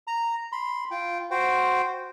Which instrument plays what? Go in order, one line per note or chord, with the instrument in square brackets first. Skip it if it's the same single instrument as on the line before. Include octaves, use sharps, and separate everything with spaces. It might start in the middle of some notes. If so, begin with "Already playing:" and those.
[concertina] A#5
B5 C6
F4 G5
F#4 C5 G5